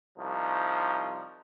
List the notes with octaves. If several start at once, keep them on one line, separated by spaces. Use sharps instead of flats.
C2 F3 D#4